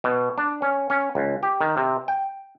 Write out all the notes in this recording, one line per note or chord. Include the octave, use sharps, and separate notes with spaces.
B2
D4
C#4
C#4
C#2
G4
D#3
C3
G5